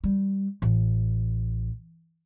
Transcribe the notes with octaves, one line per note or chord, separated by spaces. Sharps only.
G3
A1